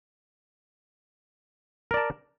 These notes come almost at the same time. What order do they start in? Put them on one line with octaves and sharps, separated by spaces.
A#4 D5 A5